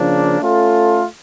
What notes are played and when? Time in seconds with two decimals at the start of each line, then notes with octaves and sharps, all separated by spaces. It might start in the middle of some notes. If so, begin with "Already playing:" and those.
Already playing: C#3 F3 A#3 D4
0.38 A3 C#4 F4 A4